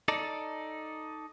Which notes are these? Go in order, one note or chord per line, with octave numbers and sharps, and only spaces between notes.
D#4 A4 D5